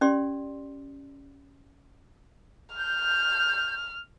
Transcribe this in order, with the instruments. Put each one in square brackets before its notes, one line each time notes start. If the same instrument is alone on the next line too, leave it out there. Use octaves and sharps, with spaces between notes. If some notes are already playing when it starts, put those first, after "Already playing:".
[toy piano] C#4 G4 D5 C6
[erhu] F6 [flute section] G6